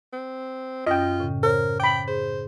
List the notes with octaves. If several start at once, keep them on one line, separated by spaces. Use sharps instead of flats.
C4
F#2 C#4 F4 D#5 G5
A2 C#3
A#4 C5 C#5
G5 B5 D6
G#4 C5